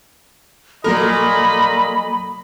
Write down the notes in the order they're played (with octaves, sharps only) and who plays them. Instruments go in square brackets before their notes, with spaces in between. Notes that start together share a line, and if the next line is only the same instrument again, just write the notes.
[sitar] A#2 A#4 [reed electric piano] F#3 A#3 A4 [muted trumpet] D#5 [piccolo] B5